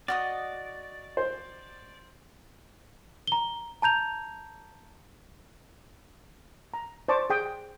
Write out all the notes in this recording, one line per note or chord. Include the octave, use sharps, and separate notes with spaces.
F#4 D5 D#5 D#6
C5
A#5 G7
A5 A#5 G6 F7
A#5
C5 D5 A5 C#6 D6
G#4 G5 D#6